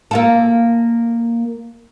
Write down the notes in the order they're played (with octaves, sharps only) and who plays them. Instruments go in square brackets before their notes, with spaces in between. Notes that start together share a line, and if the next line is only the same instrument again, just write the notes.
[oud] A#3 F4 A4